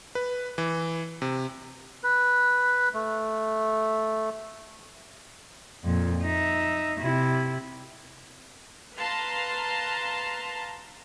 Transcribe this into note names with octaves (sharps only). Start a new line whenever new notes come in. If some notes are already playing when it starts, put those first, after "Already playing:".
B4
E3
C3
B4
A3
F2 A#2
D#4 E5
C3 E4
B4 F5 A5 A#5 C6